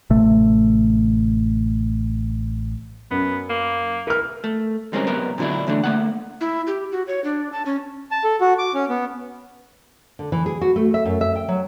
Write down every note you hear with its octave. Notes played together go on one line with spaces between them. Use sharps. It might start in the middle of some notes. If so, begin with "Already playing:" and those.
A1 C3 A3
F#2 B3
A#3
E3 A#4 F6
A3
G3 G#3 C4 C#4 A4 A#4
F#2 C3 B3 A#4
A#2 D3 F#3 D4 E4
E2 D3 A3 D4
A3 A#3 F#5
E4
G4
F#4
C#5
D4
A5
C#4
A5
A4
F#4
D6
C#4
B3
D3
E3
G#4
F#4
A3
E5
F#2
E5
G5
F#3